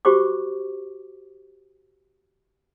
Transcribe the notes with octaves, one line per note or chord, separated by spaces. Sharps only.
F#4 G4 C5 C#6 D6